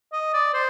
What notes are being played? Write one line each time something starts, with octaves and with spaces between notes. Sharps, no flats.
D#5
D5
C5